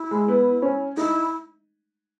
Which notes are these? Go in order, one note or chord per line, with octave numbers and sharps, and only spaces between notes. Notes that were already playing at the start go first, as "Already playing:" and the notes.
Already playing: E4
G#3
B3
C#4
D#4 E4